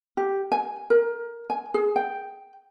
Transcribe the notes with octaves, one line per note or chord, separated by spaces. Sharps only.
G4
G#5
A#4
G#5
G#4
G5